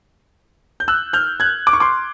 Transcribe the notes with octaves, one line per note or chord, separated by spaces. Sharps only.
G6
E6 F#6
F6 G6
F#6 G#6
D6
C#6
C6 D6